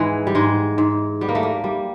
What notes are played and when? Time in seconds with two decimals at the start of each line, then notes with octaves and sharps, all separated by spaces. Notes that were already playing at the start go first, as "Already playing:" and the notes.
Already playing: G#2 E3 G#3
0.27 G3
0.35 G#2 G#3
0.78 G#2
1.21 G3 B3
1.29 A#3
1.35 A3
1.43 A#3
1.64 G3